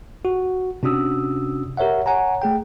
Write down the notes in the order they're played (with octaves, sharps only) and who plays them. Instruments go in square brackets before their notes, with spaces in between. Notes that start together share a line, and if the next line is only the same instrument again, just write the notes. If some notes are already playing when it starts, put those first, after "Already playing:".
[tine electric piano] F#4
C3 C#4 D4 F#4 D#6 E6
G4 A#4 C#5 E5 F#5
C#5 F#5 G#5 A#5
A3 G#4 G5